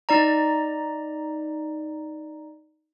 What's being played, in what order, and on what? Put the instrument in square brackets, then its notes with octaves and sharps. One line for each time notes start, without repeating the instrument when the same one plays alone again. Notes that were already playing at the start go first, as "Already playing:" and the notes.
[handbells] D#4 D5 A#5